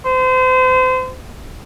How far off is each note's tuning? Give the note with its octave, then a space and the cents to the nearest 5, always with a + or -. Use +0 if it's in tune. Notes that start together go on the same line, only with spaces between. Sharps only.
C5 -35